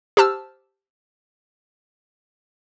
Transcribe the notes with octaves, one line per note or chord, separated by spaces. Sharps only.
G4 C5 A5 E6 F6